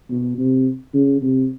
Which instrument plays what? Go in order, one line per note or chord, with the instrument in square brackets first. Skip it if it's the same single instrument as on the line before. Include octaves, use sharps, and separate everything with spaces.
[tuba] B2
C3
C#3
C3